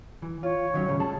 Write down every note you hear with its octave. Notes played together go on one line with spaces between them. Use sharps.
E3
F4 C#5
D#3 F#3 C#4
A2 C#3 G3
G#4 A5